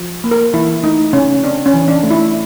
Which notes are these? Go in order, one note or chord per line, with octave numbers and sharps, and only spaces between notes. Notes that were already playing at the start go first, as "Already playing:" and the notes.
Already playing: F3
A#3
A#4
E3 E4
A3 D#4
C#3 C#4
C4 D4
C#4
E3
D4
A3
E4